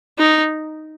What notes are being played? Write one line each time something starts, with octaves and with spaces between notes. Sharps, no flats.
D#4